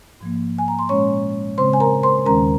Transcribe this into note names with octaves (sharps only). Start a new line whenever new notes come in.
G#2 F3 A#3
G#5
A#5
C6
A#2 G#3 C#4 C#5 C#6
C#3 G#3 C4 C5 C6
G#5
A#4 A#5
C5 C6
D#2 D#3 G#3 C#4 A#4 A#5